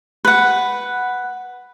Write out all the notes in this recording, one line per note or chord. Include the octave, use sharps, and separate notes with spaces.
B4 F#5